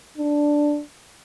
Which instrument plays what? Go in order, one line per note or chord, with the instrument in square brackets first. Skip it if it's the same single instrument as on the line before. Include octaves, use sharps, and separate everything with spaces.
[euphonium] D4